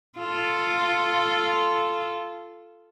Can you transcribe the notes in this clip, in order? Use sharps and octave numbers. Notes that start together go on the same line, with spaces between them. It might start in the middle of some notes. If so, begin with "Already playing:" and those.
F4 A4